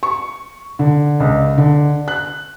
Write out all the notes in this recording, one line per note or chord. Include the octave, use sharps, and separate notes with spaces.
C#6
D3
C#2
D3
F#6